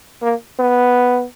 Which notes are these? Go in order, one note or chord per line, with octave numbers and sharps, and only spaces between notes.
A#3
B3